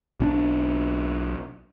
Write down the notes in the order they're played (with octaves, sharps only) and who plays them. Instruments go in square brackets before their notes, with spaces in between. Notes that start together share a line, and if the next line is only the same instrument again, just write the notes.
[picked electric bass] B1 C#4 D4